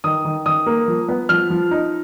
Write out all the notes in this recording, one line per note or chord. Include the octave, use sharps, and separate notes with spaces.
D#3 D#6
D#3
D#3 D#6
A#3
F3
B3
F3 F6
F3
D#4